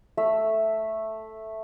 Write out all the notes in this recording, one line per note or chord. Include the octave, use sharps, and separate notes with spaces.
A3 E5